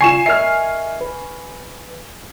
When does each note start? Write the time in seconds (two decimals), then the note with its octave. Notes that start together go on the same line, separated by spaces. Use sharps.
0.01 C#3 F4 G#5 C#6 C7 E7
0.26 A#4 D#5 E5 F6 C7
1.01 B4